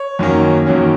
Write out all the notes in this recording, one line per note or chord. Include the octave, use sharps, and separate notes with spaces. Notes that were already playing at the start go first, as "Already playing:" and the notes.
Already playing: C#5
F#2 D#3 F#3 A#3 C#4
F#2 D#3 F#3 A#3 C#4